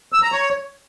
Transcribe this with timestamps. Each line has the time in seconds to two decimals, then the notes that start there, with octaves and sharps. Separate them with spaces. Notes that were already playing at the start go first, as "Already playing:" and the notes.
0.12 E6
0.22 A#5
0.32 C#5